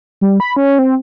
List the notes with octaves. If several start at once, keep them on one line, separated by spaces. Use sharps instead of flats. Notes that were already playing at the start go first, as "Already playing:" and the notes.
G3
B5
C#4
C4